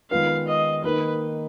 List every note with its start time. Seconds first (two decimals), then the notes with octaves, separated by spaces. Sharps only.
0.11 D#3 G#3 B3 F4 B4 F5
0.48 D#5
0.84 D#3 A#3 D#4 A#4 B4